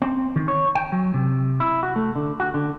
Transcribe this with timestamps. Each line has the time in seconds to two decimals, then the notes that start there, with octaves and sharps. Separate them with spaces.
0.02 C4
0.36 D#3
0.48 C#5
0.75 G5
0.92 F#3
1.14 C3
1.60 E4
1.83 F#4
1.96 A3
2.16 D3
2.40 F#4
2.54 D3